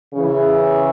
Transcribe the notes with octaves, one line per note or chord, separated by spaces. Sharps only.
C#3 E3